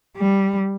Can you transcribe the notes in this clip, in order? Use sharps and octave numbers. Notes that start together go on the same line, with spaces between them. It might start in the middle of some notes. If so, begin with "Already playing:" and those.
G3